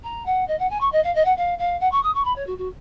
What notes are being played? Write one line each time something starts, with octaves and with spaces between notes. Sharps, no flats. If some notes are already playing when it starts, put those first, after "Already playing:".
A#5
F#5
D#5
F#5
G#5
C#6
D#5
F5
D#5
F#5
F5
F5
F#5
C#6
D#6
C#6
B5
C#5
F#4
F#4